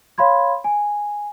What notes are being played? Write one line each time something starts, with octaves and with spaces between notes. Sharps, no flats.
C#5 F5 B5 C6 G#6
G#5